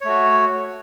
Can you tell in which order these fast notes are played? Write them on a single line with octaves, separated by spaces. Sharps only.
C#5 A3 F#4